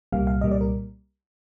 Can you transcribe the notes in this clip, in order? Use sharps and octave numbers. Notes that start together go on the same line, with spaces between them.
C2 A#2 G3 A#3 F5
F5
C2 A#2 G3 A#3 D#5
D5
A#4